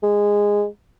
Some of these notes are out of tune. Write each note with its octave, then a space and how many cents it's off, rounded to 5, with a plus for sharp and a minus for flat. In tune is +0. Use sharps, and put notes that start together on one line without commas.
G#3 -15